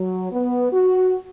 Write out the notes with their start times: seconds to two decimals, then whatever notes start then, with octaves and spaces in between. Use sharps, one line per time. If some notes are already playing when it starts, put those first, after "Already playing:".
Already playing: F#3
0.32 B3
0.73 F#4